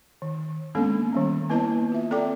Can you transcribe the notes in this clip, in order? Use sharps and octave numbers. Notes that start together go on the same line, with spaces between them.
D#3
G#3 A#3 B3 C#4 D4 A4
D#3 G3 C#4
A#3 B3 E4 B4 D#5 A5
F4 E5
C4 A4 D5 G5 D6